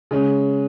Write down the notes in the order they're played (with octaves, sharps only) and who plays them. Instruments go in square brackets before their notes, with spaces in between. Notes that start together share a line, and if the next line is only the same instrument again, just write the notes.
[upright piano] C#3 G#3 C#4